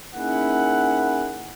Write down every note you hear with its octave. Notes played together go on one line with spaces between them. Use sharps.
A#3 C#4 D#4 E4 G#4 F#5